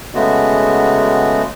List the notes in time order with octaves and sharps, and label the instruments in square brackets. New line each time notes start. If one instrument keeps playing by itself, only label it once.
[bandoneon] C#3 G#3 A3 B3 F#4